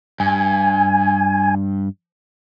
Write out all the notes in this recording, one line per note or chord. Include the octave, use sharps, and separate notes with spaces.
G2 G#5